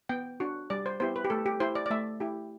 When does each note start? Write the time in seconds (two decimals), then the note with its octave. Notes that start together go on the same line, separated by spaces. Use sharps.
0.09 B3 G5
0.40 D4 F#4
0.70 G3 D5
0.86 C5
1.00 B3 E4 G4 C5
1.16 B4
1.25 G4
1.30 A3 A4
1.46 G4
1.60 E4 G4 C5
1.75 D5
1.86 D5
1.91 A3 E5
2.20 E4 G4